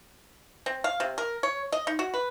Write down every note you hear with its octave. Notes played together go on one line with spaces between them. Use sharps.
C4
F5
C3
A#4
C#5
D#5
D#4
F#4
B4